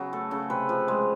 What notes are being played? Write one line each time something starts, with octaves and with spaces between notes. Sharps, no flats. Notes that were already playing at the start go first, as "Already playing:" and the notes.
Already playing: C#3 F#3 B3
A3 A4
C#3 A4
C3 B4
F3
G#3